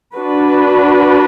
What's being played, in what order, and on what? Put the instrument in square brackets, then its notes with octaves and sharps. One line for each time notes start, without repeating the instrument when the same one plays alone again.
[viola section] D4 F#4 B4